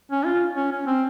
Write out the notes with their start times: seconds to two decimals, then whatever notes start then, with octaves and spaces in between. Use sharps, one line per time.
0.11 C#4
0.25 F4
0.56 C#4
0.72 C#4
0.87 C4